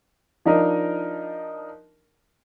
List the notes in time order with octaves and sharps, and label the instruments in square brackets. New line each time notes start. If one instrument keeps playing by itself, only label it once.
[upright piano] F3 D4 D#4 A#4 D#5